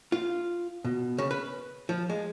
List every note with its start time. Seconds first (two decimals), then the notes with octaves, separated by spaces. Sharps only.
0.12 F4
0.85 B2
1.18 C#3
1.31 B4
1.89 F3
2.10 G#3